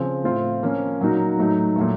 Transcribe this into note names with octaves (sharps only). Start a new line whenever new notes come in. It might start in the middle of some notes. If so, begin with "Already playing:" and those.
Already playing: C#3 F3 C4
A2 A3 C4 F4
F3 A#3 C#4 F4
A#2 F#3 A#3 D#4 F#4
A2 F#3 A3 D#4
A#2 F#3 A3